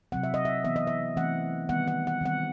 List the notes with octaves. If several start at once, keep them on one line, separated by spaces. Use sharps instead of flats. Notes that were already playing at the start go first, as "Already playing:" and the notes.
C3 F#3 C4 F#5
E5
D#5
E5
E3 B3 E5
D#5
E5
E3 A3 C4 F#5
D#3 G3 B3 F#5
F#5
F#5
D#3 G3 C4 F#5